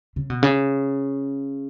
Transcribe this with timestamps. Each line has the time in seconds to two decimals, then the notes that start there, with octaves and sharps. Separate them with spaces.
0.16 C#3
0.30 B2
0.43 C#3